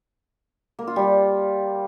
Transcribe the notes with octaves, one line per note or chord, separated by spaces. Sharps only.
A#3
F4
G3